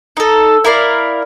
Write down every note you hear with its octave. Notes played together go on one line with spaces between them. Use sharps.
D#4 A4
E4 A#4 D5 F5